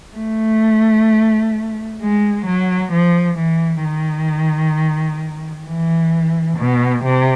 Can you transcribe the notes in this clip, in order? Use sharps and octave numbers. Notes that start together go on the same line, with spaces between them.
A3
G#3
F#3
F3
E3
D#3
E3
B2
C3